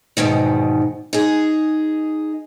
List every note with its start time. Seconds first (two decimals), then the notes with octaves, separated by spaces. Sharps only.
0.17 E2 G#2 B2 D#3
1.13 D#4 G#4